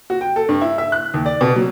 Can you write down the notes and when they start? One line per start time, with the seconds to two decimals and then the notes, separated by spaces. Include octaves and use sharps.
0.10 F#4
0.21 G5
0.36 A4
0.49 G2
0.61 E4
0.78 E5
0.92 F#6
1.14 D#2
1.26 D5
1.41 B2
1.56 F#3